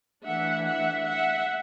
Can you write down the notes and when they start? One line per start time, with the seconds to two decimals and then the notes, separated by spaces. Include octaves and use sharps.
0.24 E3 A3 D4 E5 F#5
0.66 E5 F#5
1.06 E5 F#5